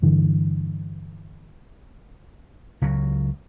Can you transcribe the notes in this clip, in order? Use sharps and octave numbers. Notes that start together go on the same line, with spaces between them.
G2 D3 E3
C#2 C#3 F#3